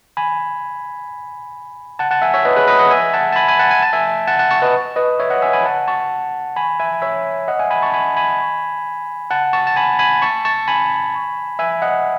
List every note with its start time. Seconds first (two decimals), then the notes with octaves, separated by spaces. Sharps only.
0.17 G#5 B5
1.99 F#5 A5
2.11 F#5 A5
2.22 E5 G#5
2.34 C#5 E5
2.45 B4 D#5
2.56 G#4 B4
2.67 B4 D#5
2.79 D#5 F#5
2.91 E5 G#5
3.14 F#5 A5
3.32 A5
3.36 G#5 B5
3.48 G#5 B5
3.59 F#5 A5
3.71 G#5
3.82 A5
3.93 E5 G#5
4.27 F#5 A5
4.39 F#5 A5
4.51 A5 C#6
4.62 B4 D#5
4.96 B4 D#5
5.19 C#5 E5
5.30 D#5 F#5
5.42 E5 G#5
5.53 G#5 B5
5.65 F#5 A5
5.88 A5 C#6
6.56 G#5 B5
6.80 E5 G#5
7.02 C#5 E5
7.48 D#5 F#5
7.59 E5 G#5
7.71 G#5 B5
7.82 A5 C#6
7.94 G#5 B5
8.16 G#5 B5
9.30 F#5 A5
9.53 A5 C#6
9.67 A5
9.76 G#5 B5
9.99 G#5 B5
10.22 A5 C#6
10.45 A5 C#6
10.68 G#5 B5
11.59 E5 G#5
11.82 D#5 F#5